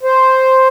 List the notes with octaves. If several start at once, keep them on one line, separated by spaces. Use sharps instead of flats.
C5